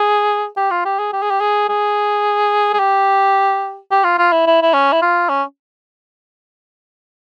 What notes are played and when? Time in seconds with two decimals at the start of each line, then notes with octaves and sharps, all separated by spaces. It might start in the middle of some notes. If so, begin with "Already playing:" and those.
Already playing: G#4
0.57 G4
0.71 F4
0.85 G4
0.99 G#4
1.13 G4
1.22 G#4
1.30 G4
1.40 G#4
1.69 G#4
2.73 G#4
2.79 G4
3.91 G4
4.04 F4
4.18 F4
4.32 E4
4.47 E4
4.62 E4
4.73 C#4
4.92 E4
5.02 F4
5.29 C#4